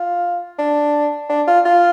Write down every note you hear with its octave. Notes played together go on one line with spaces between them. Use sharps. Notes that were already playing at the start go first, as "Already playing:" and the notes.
Already playing: F4
D4
D4
F4
F4